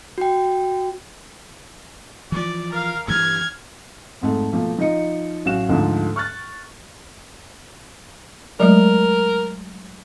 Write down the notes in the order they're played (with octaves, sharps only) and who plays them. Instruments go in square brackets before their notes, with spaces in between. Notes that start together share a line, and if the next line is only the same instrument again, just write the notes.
[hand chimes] F#4 G5
[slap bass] E3 F3 [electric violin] D5
[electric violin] A#4 F5
[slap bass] G2 E3 [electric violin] F6 G#6
[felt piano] F2 G#2 A3
B2 F3 A3 A#3
F3 D#4 D#5 C#7
A1 F#3 F#4 F5 F#6 E7
D2 G#2 D3 F3 A3 D4
C#6 F6 F#6 A6
[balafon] F#3 G#3 A3 [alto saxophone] A#4